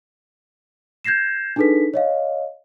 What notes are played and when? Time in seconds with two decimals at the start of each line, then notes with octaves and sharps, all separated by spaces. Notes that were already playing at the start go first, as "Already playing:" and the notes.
1.05 G6 G#6 A#6 C7 E7
1.56 D4 D#4 G#4 A4 B4 B6
1.94 C#5 D#5 F5